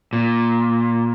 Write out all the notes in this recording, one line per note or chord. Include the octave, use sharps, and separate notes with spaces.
A#2